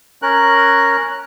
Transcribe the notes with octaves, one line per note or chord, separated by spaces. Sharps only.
C#4 A#4 F#6